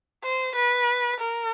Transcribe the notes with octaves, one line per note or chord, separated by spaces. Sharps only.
C5
B4
A#4